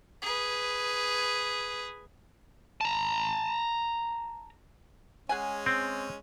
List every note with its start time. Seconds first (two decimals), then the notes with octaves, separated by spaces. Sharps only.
0.22 G#4 B4
2.81 A5 A#5
5.29 G#3 C#4 G#4 F#5 G#5
5.66 C4